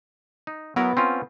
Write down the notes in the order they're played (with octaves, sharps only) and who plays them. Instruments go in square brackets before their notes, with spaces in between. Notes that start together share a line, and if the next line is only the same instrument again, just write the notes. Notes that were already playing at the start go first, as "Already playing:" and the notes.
[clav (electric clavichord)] D#4
[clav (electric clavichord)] F#3 E4 A#4 [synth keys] B3
[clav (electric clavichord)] C4 C#4 F4